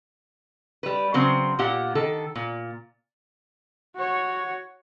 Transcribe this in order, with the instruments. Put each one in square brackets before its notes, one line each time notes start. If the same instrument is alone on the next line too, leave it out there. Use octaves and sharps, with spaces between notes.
[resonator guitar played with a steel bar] G3 B4
C#3 F#3 C4 C5
A#2 A#3 G4 F#5
D#3 A4
A#2
[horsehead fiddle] F#4 C#5